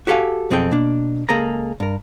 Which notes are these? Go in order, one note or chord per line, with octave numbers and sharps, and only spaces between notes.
F#4 G4 A4 F5 G#5
B1 F2 C4 G#4 A4 G5
B2 A#3 D4
C#2 A#3 G#4 A4 A#5
G2 A#4